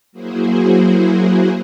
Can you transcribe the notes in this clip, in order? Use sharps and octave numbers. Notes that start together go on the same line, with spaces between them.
F#3 A#3 E4 F#4 G#4 C5